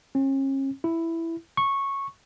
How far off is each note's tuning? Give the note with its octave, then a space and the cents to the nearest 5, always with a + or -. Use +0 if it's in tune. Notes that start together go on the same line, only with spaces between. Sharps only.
C#4 -40
E4 +5
C#6 -10